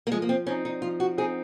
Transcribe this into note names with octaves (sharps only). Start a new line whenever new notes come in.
A#3
F3 G#3
A#3
C4
C4 C#4 D#4
D#4
F3 F4
F#4
C4 D#4 G#4